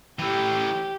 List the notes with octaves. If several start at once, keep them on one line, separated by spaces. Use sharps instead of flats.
E3 A3 G4